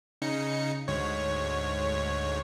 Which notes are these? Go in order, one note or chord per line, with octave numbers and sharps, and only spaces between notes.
C#3 D#4 C#7
D2 G#2 C#5